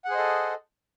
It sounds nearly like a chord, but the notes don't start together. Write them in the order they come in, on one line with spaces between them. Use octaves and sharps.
F#5 G#4 C5 D#5 A4